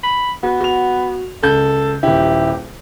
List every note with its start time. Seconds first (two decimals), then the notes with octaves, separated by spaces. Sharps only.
0.03 B5
0.43 B3 F#4
0.61 F#4 F7
1.43 C#2 A4 G6
2.03 D#1 E4 G4